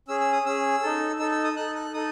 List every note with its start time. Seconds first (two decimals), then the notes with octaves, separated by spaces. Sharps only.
0.08 C#4 G#4 E6
0.21 E6
0.32 D#6
0.45 C#4 G#4 E6
0.82 D#4 A4
1.19 D#4 A4 E6
1.31 E6
1.44 D#6
1.56 D#4 A4 F#6
1.75 F#6
1.94 D#4 A4 D#6